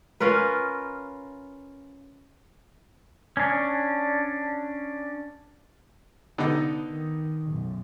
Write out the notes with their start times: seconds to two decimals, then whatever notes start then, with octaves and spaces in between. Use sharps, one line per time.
0.20 C#4 F4 A#4 B4
3.37 C#4 D4
6.38 D3 B3 D#4
6.89 D#3
7.48 B1 F#2